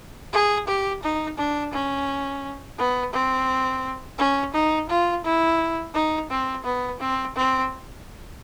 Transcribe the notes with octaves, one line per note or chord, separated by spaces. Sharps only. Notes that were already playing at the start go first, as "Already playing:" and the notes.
G#4
G4
D#4
D4
C#4
B3
C4
C#4
D#4
F4
E4
D#4
C4
B3
C4
C4